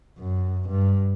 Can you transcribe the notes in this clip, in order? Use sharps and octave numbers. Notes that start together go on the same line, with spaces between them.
F#2
G2